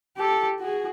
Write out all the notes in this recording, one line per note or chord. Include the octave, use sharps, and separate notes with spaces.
G4 A4
F#4 G#4